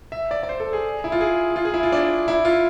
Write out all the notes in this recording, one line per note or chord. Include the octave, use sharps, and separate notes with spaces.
E5
D5
D5
C5
A4
G#4
E4
F4
G#4
F4
G#4
E4
F4
D4
E4
F4